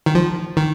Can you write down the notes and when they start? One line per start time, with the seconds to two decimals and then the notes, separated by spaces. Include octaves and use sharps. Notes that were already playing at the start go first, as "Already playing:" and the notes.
0.06 D#3
0.15 F3
0.57 D#3